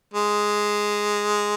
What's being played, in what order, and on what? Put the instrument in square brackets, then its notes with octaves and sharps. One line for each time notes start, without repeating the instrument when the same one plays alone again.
[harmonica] G#3